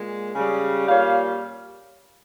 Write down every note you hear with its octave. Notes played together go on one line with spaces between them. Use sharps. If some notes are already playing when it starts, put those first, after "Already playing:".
Already playing: A#2 G#3
C#3 G3
A#2 G3 C#5 F5